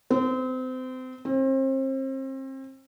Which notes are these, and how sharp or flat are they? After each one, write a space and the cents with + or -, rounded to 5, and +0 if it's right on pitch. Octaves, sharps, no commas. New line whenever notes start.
C4 -30
C4 +35